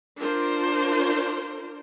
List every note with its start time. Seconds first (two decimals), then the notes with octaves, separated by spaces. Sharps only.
0.20 D4 F4 A#4 C5